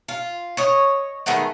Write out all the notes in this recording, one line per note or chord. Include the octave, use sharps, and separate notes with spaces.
F4
C#5 D#5
D#3 G#3 A3 B3